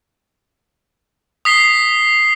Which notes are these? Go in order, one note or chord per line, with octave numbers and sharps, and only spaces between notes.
D#6 B6 C7 G7